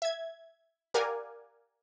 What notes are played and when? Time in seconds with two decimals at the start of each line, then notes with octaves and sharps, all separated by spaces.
0.02 E5 G#6
0.94 G4 A#4 D5 F5 F#5 G#5